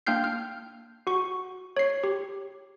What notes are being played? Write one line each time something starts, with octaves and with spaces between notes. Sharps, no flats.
A#3 D4 G5 F6 G6 C7
F6
F#4 C#6
C#5 C7
G4